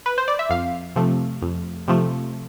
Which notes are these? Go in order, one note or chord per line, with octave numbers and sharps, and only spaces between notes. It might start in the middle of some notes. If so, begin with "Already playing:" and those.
B4
C5
D5
E5
F2 F5
C3 F3 A3
F2
C3 F3 A3